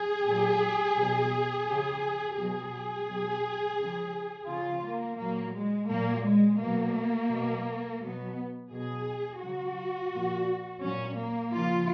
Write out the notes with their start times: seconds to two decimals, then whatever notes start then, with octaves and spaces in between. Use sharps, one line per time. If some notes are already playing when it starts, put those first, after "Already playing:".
Already playing: G#4
0.26 A#2 F#3
0.96 B2 F#3
1.67 C#3 F3
2.37 B2 F#3 G#4
3.07 B2 F#3
3.78 C#3 F3
4.48 C#3 F3 F4
4.84 A#3
5.19 A#2 F#3 A#3
5.54 G#3
5.89 A#2 F#3 A#3
6.24 G#3
6.60 B2 F#3 A#3
7.30 B2 F#3
8.00 B2 F#3 B3
8.71 B2 F#3 G#4
9.41 C#3 F#3 F#4
10.12 A#2 F3
10.82 A#2 F#3 C#4
11.18 A#3
11.52 C#3 F3 F4